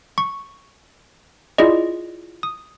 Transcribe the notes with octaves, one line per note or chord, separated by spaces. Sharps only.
C#6
E4 F4 G#4 D5 D#5
D#6